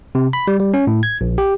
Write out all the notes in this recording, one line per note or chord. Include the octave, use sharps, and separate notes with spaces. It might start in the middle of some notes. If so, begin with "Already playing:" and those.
C3
B5
G3
G3
C#4
A2
G#6
A#1
G4